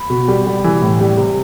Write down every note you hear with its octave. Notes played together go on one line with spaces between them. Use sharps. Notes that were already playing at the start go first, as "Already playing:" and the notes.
Already playing: B5
B2
G3
G3
E3
A2
G3
C3